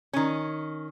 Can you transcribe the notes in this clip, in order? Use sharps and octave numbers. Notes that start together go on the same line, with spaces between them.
D#3 C#4